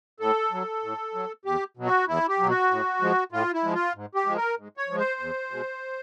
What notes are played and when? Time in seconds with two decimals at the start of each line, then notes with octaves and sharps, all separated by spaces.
0.20 A2 A4
0.52 F#3
0.83 A2
1.14 F#3
1.45 E2 G4
1.77 B2 F#3
1.86 F#4
2.08 E2 E4
2.29 G4
2.39 B2 F#3
2.49 F#4
2.70 A2
3.01 F3 G#3
3.32 A2 F4
3.54 E4
3.63 F3 G#3
3.74 F4
3.95 G#2
4.15 G4
4.26 F3 G#3
4.36 A#4
4.57 G#2
4.77 C#5
4.88 F3 G#3
4.98 C5
5.20 E2
5.51 B2 G#3